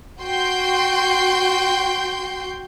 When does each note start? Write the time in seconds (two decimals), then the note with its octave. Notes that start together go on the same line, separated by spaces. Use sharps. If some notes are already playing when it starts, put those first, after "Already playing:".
0.21 F#4 G5 C6 G6